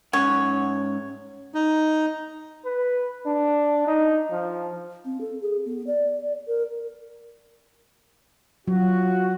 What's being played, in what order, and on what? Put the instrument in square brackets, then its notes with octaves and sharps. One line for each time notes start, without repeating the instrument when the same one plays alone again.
[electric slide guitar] G#2 C#4 F#5 [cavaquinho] C#5
[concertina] D#4
[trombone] B4
D4
D#4
F3
[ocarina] C4
A4
G#4
B3
D5
A#4
[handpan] F#3 [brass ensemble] F4 F#4